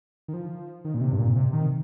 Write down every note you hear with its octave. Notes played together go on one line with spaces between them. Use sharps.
D#3
F3
D#3
A#2
C3
G2
A#2
C3
D#3